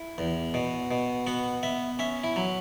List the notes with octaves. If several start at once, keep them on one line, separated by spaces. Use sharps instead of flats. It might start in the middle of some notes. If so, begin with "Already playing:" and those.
Already playing: E4
E2
B2
B2
B3 F#4
B3 E5
C#4 E5
E4
F#3